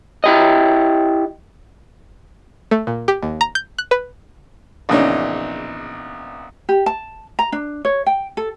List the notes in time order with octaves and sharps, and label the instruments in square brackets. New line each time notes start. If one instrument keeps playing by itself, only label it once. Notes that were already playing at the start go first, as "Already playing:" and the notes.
[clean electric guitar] E4 G4 D#5
[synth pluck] A3
A#2
G4
D#2
A#5
G6
F#6
B4
[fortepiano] A#1 E2 C#3 D4 D#4 C#5
[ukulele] G4
A5
A#5
D4
C#5
G5
A4